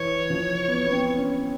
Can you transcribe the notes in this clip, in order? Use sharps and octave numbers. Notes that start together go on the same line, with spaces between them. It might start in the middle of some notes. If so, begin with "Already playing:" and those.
Already playing: E3 C#5
F3
B3
B3
C4
C#4